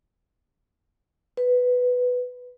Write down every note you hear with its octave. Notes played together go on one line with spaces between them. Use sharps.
B4